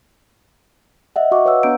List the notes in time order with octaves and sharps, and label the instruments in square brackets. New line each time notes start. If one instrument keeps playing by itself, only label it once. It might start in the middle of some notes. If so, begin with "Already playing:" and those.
[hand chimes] D#5 E5 F#5
F#4 D#5 F#5 C#6 D6
B4 C#5 F5 F#5 E6
B3 D4 A#5 G6 D7